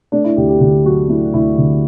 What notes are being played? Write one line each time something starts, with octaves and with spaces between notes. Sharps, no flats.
A3 D4
E4
D2 G4
G4
D3 G4
F#3 F#4
A3 E4
D2 E4
D3